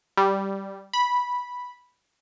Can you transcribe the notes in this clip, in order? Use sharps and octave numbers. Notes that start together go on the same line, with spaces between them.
G3
B5